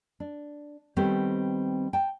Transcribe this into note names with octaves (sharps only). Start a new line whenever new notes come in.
D4
D#3 G3 B3 C4 A4 C#5
G5 A5